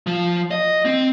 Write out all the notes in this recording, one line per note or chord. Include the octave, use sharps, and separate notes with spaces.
F3
D#5
C4